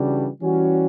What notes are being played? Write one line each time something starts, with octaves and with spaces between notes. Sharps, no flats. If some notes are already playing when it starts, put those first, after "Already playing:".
Already playing: C#3 E3 G3 D4 F#4
E3 G3 C#4 F#4